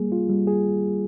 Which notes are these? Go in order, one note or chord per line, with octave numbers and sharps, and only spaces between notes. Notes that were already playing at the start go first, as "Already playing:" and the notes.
Already playing: G3 A#3 G#4
F4
G3
G#4